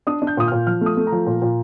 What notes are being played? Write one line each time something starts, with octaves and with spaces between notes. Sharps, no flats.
D4 D#6
D4
G6
A#2 D#6
A#2 F6
F3 F6
A3 D#6
A3
A#5
F3
A#2
A#2